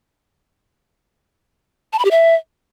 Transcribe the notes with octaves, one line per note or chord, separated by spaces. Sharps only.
A5
B5
G4
E5